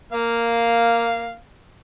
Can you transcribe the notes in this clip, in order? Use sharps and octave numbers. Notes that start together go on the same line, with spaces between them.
A#3 F5